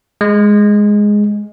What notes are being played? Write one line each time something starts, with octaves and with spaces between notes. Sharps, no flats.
G#3